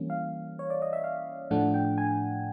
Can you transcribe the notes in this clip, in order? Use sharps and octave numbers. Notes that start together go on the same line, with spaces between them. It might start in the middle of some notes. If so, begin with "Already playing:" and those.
Already playing: E3 G3 A#3 C#4
F5
C#5
D5
D#5
E5
F5
A2 F3 A3 D4 F#5
G5
G#5